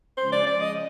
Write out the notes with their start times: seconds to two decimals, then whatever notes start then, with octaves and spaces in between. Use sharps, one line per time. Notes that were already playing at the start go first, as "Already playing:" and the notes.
0.17 C#3 F3 G#3 C#4 C5
0.32 D5
0.47 D5
0.61 D#5